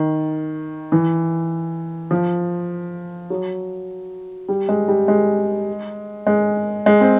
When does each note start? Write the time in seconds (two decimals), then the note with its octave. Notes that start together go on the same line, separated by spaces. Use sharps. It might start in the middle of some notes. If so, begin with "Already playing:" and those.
Already playing: D#3
0.92 E3
2.11 F3
3.30 F#3
4.49 G3
4.69 G#3
4.88 G3
5.08 G#3
6.27 G#3
6.86 G#3
7.01 C4